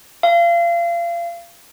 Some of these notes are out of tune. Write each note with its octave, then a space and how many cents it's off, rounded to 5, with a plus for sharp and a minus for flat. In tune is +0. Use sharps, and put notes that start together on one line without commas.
F5 -30